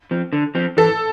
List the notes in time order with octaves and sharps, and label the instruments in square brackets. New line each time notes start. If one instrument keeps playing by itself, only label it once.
[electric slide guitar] F3 C4
D3
F3 C4
[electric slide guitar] E3 [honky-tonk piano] A4